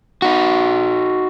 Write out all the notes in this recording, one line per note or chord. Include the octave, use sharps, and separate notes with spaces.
D#4 F#4